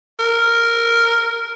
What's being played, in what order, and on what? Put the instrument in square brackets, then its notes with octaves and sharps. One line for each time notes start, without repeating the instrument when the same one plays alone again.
[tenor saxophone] A#4